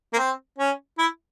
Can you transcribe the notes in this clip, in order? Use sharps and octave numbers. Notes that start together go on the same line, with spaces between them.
A#3
C4
C#4
E4